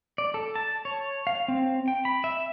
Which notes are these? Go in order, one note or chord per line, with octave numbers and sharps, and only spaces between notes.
D5
A4
A5
C#5
F5
C4
G5
B5
E5